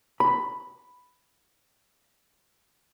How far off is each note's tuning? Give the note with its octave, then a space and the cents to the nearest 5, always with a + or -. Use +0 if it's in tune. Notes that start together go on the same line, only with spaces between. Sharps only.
B5 +5